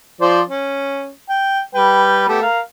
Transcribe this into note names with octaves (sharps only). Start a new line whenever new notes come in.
F3 C5 D5
C#4
G5
G3 B4 G5
A3 B3 G4
A#4 F5